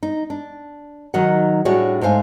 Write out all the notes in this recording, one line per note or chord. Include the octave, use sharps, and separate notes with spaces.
D#4
D4
D#3 F#3 D#4 D#5 F#5
A2 G3 D4 F#4 G#4 C#5
G#2 A3 C5 F5 G#5